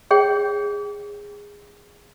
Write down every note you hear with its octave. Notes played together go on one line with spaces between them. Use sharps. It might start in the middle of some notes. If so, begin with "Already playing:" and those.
G#4 C#5 G5